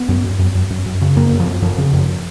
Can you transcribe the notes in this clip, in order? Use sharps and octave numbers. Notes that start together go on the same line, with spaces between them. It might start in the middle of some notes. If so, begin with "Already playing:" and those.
Already playing: B3
F#2
F#2
F#2
F#2
F#2
F#2
C#3
F#2 A#3
F#2
F3
F#2
F#2 F3
C#3
F#2